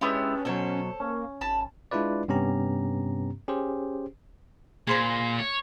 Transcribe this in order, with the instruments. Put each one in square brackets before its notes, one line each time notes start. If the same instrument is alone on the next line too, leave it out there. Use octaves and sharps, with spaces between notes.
[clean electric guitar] G#3 E4 [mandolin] B3 D4 G4 [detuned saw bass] C#4
[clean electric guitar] B2 F#3 [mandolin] A4 C5 C#5
[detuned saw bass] A#3 [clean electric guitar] C#4
[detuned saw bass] G#1 [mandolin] A5 B5
[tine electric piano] G#3 D4 E4 F4 B4 D5
G2 C3 B3 C#4 G4 A#5
C#4 G4 G#4 C5
[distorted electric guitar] A#2 [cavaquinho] G#4 C5 B5
[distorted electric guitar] C#5